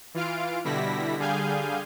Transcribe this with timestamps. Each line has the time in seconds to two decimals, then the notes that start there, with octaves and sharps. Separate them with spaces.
0.14 E3 F4 F5 D7
0.64 B2 D3 G3 E4 A#6 B6
1.18 D3 G3 G#4 F5 G#5 G6